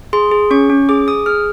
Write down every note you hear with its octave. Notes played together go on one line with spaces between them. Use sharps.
G#4 C6
G#4
C#4 C#6
C#4
G#4 D6
G#4 D#6
G#4 F6